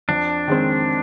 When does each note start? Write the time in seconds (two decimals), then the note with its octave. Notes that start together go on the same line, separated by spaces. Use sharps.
0.09 F2 D4
0.48 D#3 G#3 C4